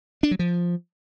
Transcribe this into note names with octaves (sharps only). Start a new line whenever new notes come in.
D4
F#3
F3